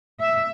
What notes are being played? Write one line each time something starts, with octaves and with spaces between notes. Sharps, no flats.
E5